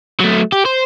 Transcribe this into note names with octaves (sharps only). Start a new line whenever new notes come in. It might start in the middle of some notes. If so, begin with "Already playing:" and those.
F#3 A3
G4
C5